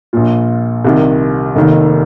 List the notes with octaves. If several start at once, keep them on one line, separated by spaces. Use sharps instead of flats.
A#1 A#2 F4
C2 C3 D#3
F1 D#2 D#3